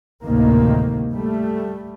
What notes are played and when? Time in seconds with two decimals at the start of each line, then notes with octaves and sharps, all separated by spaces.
0.23 G#1 D2 A2 C3 D#3 A#3
1.11 G3 A3